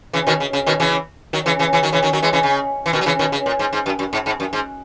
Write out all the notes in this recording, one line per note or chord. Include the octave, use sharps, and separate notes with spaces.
C#3 E3
B2 D#3
C#3
C#3
B2 D#3
C#3 E3
D#3 F#3
C#3 E3
C#3 E3
C#3 E3
D#3 F#3
C#3 E3
D#3 F#3
D#3 F#3
E3 G#3
C#3 E3
C#3
E3
B2 D#3
F#3
C#3 E3
B2 D#3
C#3
A#2
G#2
G#2
F#2
F#2
G#2
G#2
F#2
G#2